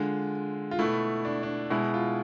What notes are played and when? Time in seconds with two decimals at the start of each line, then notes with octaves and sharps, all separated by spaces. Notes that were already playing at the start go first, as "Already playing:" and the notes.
Already playing: D3 G#3 F4
0.71 F4
0.79 B2 A3 E4
1.25 D4
1.43 D4
1.70 B2 G#3 E4
1.94 F4